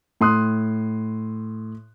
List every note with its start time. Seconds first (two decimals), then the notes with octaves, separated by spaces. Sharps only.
0.21 A2 C6 D#6 F#6